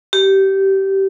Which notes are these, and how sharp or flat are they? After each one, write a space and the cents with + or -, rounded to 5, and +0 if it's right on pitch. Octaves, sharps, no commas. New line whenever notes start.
G4 -20